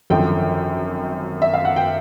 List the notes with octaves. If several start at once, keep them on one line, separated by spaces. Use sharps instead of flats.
G#1 F#2 D3 F3 G5
E5
F5
F#5
G5